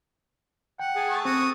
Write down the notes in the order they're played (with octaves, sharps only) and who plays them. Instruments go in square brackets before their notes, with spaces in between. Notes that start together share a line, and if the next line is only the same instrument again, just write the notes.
[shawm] F#5 [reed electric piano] G5
[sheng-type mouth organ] G#4 [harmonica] A5
[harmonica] A3 A5 C#6
[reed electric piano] C4 [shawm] F#4 [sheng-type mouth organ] D#6